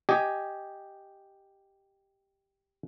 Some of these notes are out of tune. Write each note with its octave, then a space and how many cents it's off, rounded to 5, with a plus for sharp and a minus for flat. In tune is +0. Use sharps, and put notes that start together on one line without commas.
G4 +0 D#5 +0 G#5 +0